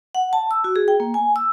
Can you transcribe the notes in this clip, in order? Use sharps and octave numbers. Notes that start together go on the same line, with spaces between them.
F#5
A5
E6
F#4
G#4
G5
A#3
G#5
E6